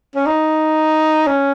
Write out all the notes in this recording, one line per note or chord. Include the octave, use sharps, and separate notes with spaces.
C#4
D#4
C#4